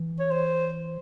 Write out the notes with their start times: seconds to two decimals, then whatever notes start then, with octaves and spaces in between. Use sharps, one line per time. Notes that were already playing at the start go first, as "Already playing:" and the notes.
Already playing: E3
0.19 C#5
0.31 C5